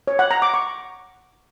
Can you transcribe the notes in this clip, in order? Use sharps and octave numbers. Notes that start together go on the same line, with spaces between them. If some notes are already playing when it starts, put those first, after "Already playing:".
C#5
F#5
A#5
D6
C#6